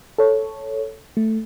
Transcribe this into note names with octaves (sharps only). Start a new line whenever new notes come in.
A4 C#5
A3